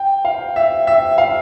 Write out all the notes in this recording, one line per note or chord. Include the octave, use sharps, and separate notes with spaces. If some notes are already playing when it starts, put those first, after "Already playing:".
Already playing: G5
F5
E5
E5
F5